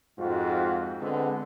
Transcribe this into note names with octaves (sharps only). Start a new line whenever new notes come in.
F2 G#2 F4 F#4
D3 G#3 B3 C4